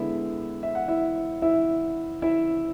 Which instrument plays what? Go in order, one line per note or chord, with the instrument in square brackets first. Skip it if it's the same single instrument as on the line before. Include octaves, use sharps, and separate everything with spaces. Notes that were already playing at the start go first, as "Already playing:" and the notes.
Already playing: [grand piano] D3 G#3 B3 E4 E5
E5
F#5
E4 E5
E4 E5
E4 E5